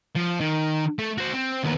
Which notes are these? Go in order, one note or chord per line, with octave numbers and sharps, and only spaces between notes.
F3
D#3
A3
F#4 C5
C4
D#2 B3